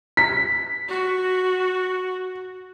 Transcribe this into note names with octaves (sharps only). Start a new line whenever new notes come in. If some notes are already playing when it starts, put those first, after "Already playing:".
B6
F#4